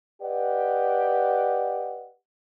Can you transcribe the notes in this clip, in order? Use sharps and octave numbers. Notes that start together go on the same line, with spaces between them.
G4 B4 D5 D#5 F#5